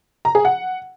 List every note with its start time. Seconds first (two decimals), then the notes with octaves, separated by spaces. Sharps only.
0.25 A#5
0.35 G#4
0.45 F#5